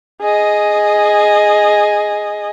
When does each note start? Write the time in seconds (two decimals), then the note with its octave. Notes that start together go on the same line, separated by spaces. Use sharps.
0.21 G#4 D#5